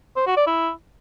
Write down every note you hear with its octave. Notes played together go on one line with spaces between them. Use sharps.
C5
F#4
D5
E4